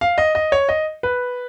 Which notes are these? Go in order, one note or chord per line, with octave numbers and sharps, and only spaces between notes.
F5
D#5
D#5
C#5
D#5
B4